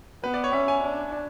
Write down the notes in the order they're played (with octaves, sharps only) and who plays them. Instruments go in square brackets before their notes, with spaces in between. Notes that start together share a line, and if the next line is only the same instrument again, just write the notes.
[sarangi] B3 [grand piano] B4
[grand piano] D5
C#5
[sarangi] C#4 [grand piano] E5
[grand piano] G#5
[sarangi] D4